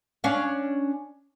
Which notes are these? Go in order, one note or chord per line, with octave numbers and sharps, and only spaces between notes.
C#4 D4 F5